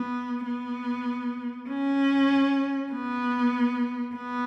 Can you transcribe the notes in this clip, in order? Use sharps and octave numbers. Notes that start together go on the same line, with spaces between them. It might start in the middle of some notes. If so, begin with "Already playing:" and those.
Already playing: B3
B3
C#4
B3
B3